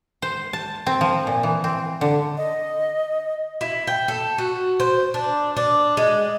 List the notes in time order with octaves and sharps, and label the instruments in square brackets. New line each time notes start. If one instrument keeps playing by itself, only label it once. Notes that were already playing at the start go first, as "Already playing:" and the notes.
[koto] C5
A5
C4
F3
A#2
E3
C4
D3
[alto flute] D#5
[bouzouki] E4
G5
A4
F#4
C5
D4
D4
G#3